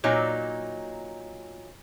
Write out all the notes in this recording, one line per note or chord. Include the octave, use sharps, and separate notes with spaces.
A#2 F#3 D#4